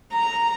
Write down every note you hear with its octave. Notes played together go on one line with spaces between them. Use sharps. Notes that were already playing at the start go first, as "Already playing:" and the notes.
A#5